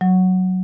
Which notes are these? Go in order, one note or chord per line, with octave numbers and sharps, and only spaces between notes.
F#3